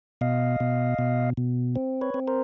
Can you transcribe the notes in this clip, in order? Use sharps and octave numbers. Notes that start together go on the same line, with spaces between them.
B2 D#5 F5
B2
B2
B2
C4
B4 C#5
C4
A#4 C5